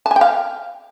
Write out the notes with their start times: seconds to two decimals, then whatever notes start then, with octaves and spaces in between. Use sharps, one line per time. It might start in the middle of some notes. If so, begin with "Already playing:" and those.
0.06 A5
0.11 G#5
0.16 G5
0.21 F5